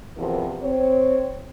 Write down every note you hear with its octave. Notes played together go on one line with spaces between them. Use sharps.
E2 C3 E3 F3 A#4
C4 C#5